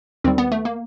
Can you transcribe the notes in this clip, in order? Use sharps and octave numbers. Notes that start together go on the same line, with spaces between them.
D#2 D#3 G3 C4
B3
A3
A#3